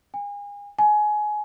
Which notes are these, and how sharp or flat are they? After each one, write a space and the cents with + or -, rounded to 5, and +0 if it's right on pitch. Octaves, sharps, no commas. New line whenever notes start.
G#5 -35
G#5 +20